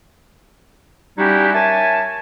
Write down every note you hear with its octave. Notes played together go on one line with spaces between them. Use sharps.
G3 C#4 D#4 E4 F#4 G4
A#4 C#5 E5 G#5 A5